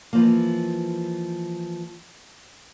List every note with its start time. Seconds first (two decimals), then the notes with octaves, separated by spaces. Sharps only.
0.13 E3 F3 A#3